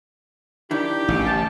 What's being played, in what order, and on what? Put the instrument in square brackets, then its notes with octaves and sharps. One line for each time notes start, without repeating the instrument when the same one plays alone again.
[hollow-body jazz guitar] D#3 D4 E4 [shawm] G4
[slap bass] A1 C#3
[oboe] A5